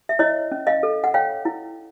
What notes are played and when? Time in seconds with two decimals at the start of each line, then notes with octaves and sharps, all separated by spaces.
0.09 E5
0.19 E4 C#5 D#5
0.52 C#4
0.67 D#5 F5
0.83 A4
1.04 F#5
1.14 C#5 F5 G5
1.45 E4